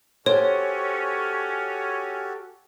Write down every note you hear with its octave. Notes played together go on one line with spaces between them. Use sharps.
C#4 F#4 G4 A4 C5 C#5